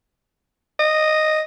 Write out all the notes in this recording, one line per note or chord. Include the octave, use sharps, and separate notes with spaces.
D#5